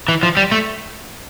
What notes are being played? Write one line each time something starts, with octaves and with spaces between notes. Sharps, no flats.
E3
F3
G3
A3